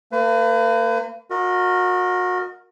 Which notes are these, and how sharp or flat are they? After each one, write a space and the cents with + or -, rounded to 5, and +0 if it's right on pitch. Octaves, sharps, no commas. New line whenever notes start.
A#3 -35 B4 +35
F#4 -30 A#4 +0 D#5 +0